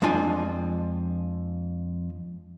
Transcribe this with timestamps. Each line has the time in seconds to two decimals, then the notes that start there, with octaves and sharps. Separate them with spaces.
0.02 F2 G#3 D4 F4 G#5